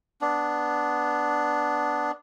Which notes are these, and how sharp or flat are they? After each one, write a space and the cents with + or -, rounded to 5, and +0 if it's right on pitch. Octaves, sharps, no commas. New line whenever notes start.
B3 +0 D4 +0